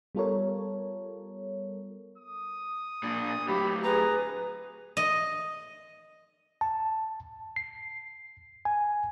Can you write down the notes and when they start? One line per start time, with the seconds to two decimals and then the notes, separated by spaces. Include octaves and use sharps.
0.15 G3 B3 F4 A4 A#4 C#5
2.18 D#6
3.03 A#2 D4
3.48 A2 F#3 G4 B5
3.84 G#4 B4 A#5
4.97 D#5
6.61 A5
7.56 C7
8.65 G#5